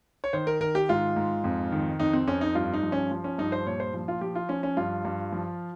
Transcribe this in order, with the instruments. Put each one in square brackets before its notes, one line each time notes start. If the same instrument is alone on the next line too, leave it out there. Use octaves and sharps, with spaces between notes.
[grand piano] C#5
D#3 C5
A#4
D#3 A#4
G4
G#2 F4
G#2
F2
D#3
F2 D#4
C4
F2 C#4
D#4
G2 F4
D#4
F3
C#4
F3
C#4
G2 D#4
C5
A#2 C#5
C5
F3
F4
F3 G4
F4
F3 C#4
C#4
G2 F4
G2
F3